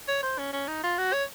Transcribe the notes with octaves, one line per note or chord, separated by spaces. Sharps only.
C#5
C5
C#4
C#4
D#4
F4
F#4
C#5